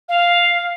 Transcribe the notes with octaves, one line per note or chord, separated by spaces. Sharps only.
F5